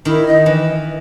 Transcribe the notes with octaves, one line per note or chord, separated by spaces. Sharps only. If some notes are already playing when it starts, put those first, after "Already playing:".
D#3 E4
D#5
E3